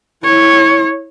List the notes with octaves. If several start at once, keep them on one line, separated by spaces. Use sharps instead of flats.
E4 C#5